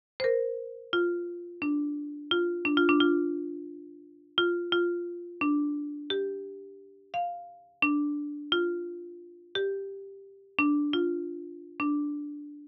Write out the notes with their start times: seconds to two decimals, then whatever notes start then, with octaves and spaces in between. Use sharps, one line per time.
0.20 C5
0.24 A#4
0.93 F4
1.62 D4
2.31 F4
2.65 D4
2.77 F4
2.89 D4
3.00 F4
4.38 F4
4.72 F4
5.41 D4
6.10 G4
7.14 F5
7.82 D4
8.52 F4
9.55 G4
10.59 D4
10.93 F4
11.80 D4